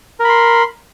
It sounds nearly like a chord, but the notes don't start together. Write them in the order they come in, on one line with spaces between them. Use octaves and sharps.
A#4 B5 C6